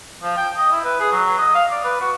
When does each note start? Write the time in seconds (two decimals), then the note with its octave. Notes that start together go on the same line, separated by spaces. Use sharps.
0.23 F3
0.37 G5
0.57 D#5
0.72 E4
0.84 B4
1.00 G#4
1.12 F#3
1.38 D#5
1.54 F5
1.71 D5
1.84 B4
2.01 F#4